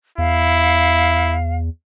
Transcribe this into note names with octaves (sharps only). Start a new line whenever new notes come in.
E2 E4 F5